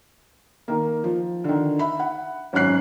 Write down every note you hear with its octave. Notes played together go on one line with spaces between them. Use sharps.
D#3 A#3
F3
D3 D#3
E5 B5
F#5
G#1 F#2 C#4 F#6 C7